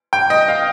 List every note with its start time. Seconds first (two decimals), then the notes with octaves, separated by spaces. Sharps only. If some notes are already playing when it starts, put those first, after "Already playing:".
0.13 G5
0.30 D#5
0.48 F5